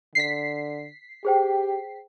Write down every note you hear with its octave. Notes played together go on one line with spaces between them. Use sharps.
D3 B6 C7
G4 G#4 C5 G5